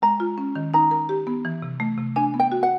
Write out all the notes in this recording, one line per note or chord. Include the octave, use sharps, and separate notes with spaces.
G#3 A#5
F4
C#4
D#3
D#4 A#5
A#4
G4
B3
E3
C3
A3
C3
D4 G#5
B3
G5
F#4
F#5